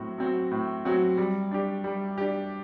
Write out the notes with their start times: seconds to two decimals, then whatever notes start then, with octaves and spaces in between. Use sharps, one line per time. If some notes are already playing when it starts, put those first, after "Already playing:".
Already playing: A2 F#3 C4 F#4
0.18 F#3 C4 F#4
0.52 A2
0.85 F#3 C4 F#4
1.17 G3
1.51 D4 G4
1.84 G3
2.18 D4 G4